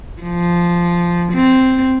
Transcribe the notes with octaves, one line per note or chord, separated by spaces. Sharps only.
F3
C4